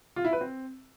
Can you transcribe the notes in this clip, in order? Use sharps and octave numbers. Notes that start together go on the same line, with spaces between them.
F4
E4
B4
C4